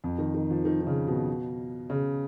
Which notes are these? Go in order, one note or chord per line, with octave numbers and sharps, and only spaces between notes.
F2
D#3
D#3
F3
D#3
D#3
C#3
B2
C#3